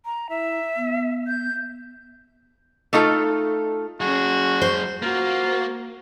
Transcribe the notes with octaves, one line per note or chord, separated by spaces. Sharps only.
A#5
E4 E5
B3
G6
A3 D#4 F4 A4
F#3 C#4 F#4 G#4
C5
A#3 F4 F#4